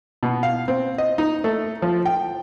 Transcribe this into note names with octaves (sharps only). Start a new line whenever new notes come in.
B2
F5
C4
D#5
D#4
A3
F3
G5